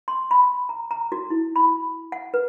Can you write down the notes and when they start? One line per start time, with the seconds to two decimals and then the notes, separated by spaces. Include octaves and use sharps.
0.08 C6
0.31 B5
0.69 A#5
0.91 A#5
1.12 F#4
1.30 E4
1.56 B5
2.12 F#5
2.34 B4